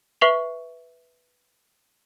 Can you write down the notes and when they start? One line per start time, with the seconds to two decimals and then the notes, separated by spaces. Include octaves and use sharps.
0.21 B4 E5 C#6 C7 F7 F#7